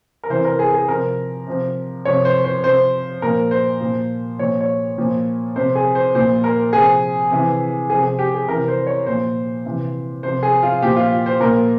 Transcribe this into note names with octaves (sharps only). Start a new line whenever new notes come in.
A#4
C3 E3 C5
A#4
G#4
G#4
C3 F3 A#4
C3 F3
C3 F3 C#5
C5
C5
C3 F3 C5
A#2 F3 A#4
C5
A#2 F3
A#2 F3 C#5
C#5
A#2 F3
C3 F3 C5
G#4
C5
A#2 F3 C5
A#4
C3 F3 G#4
C3 E3
C3 F3 G#4
G#4
G4
G#4
C3 E3 A#4
C5
C#5
A#2 F3 C5
C3 E3
C3 F3 C5
G#4
F4
A#2 F3 G4
F4
C5
A#2 F3 A#4